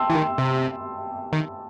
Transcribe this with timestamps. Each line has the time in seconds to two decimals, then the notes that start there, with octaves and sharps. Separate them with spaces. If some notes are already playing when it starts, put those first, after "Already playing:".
Already playing: G5 A5 C6 E6
0.10 E3
0.15 D#3
0.38 C3
1.33 D#3